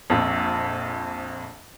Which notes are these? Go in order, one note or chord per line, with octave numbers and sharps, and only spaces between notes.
A#1 F2